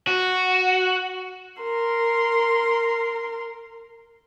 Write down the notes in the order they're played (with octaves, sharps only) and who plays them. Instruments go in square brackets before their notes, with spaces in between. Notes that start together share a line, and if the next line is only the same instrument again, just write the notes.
[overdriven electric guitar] F#4
[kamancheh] A#4 C6